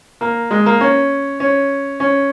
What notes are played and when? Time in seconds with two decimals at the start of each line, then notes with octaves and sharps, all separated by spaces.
0.21 A#3
0.51 G#3
0.66 A#3
0.81 C#4
1.40 C#4
2.00 C#4